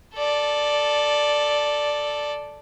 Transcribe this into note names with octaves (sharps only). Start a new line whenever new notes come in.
A4 D5